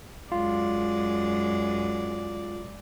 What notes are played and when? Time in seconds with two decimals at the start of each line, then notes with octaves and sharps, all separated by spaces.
0.32 F#2 G#3 F4 D5